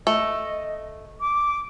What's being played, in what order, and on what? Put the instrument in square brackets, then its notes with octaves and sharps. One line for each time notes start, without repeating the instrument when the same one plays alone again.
[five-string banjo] A3 [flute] D#5
[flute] D6